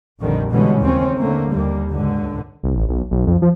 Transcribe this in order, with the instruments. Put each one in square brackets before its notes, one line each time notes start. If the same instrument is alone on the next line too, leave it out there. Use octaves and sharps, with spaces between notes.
[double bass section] A#1 F2 D3 D#3 G3
B2 D3 E3 G3 G#3 C#4
D#2 C#3 C4 C#4
D3 A3 A#3
D#2 G3 A#3
C#2 G#2 D3
[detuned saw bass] C2
A1
B1
B1
F2
F3